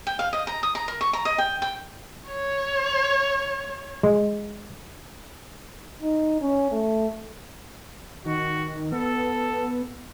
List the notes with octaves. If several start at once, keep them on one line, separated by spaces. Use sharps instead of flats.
G5
F5
D#5
A#5
D#6
A#5
A#4
C#6
A#5
D#5
G5
G5
C#5
G#3
D#4
C#4
A3
D#3 F#4
B3 A4